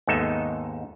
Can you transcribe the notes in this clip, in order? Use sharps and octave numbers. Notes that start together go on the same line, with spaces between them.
D#2 G#2 B3 D#4 A4 E5